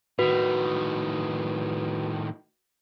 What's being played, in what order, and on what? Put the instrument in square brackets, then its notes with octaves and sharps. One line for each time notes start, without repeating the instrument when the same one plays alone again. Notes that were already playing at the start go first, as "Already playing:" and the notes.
[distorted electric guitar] A2 D#3 [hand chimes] F#4 B4